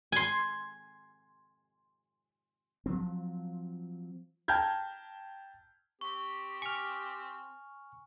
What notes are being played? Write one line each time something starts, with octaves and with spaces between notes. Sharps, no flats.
G#5 C6
F3 F#3 C4
G5 A5 A#5 F6 G6 G#6
C4 G4 C#6
G#5 C#6 F6